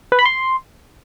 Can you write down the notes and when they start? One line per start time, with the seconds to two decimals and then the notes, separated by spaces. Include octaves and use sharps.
0.12 B4
0.19 B5
0.25 C6